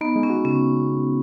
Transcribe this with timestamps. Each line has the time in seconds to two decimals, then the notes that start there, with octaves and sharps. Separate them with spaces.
0.01 B3 D#4
0.16 G#3
0.23 C#4
0.30 F#4
0.45 C#3 C#4